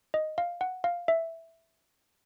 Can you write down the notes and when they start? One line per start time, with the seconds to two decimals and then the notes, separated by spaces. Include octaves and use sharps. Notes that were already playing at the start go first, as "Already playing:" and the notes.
0.14 D#5
0.38 F5
0.61 F#5
0.84 F5
1.08 E5